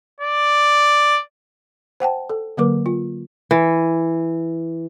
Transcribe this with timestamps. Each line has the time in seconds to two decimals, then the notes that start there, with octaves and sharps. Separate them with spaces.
0.20 D5
2.00 C5 F#5 G5 A5
2.30 A4
2.57 D3 F#3 A#3 A#4 B4 D6
2.86 F4
3.51 E3